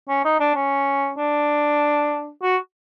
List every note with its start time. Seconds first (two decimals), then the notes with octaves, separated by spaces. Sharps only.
0.09 C#4
0.25 D#4
0.40 D4
0.55 C#4
1.18 D4
2.43 F#4